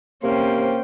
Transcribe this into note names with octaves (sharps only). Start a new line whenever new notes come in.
C3 A#3 C#4 C5 G5